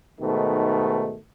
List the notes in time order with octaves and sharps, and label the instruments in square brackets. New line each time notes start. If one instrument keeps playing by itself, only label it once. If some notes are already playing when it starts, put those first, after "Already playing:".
[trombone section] G#2 B2 D#3 A3